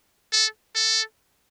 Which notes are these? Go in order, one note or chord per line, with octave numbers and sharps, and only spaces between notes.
A4
A4